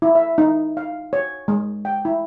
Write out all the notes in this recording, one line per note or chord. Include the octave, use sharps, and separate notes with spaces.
E4
E5
D#4
F5
C#5
G#3
G5
E4